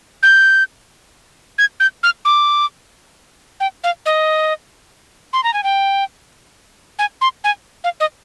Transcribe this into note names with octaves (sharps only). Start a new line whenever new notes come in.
G6
G#6
G6
F6
D6
G5
F5
D#5
C6
A#5
G#5
G5
G#5
C6
G#5
F5
D#5